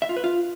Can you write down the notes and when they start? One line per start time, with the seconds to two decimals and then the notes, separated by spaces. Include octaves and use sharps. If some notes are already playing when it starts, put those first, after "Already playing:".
0.02 E5
0.09 F4
0.17 B4
0.24 F4